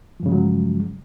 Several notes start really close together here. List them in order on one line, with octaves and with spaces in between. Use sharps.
F3 G2 C#3 G#3 F#3